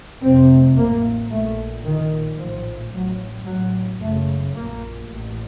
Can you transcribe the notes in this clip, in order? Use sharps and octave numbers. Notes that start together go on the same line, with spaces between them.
F1 F2 C3 C4
A1 A2 A#3
A#1 A#2 A3
A#1 A#2 D#3
A#1 A2 F3
A1 A2 F#3
A1 A2 F#3
F#1 F#2 C#3 A3
A#1 A#2 A#3
A1 A2